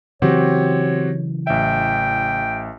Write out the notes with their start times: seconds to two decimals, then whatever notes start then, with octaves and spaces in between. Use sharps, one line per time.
0.22 C#3 E3 F#3 C4 F#4 G4 C#5
1.47 A1 E5 G5